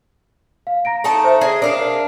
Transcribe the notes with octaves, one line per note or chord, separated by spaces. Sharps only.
F5
A#5 A#6 D7
A3 D#4 A5
C5 E5
G#4 D#5
D4 A#4 F5